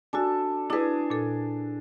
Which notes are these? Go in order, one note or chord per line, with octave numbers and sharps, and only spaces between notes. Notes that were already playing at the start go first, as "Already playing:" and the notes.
D4 F#4 A4 G#5
D4 E4 G#4 B4
A#2 A4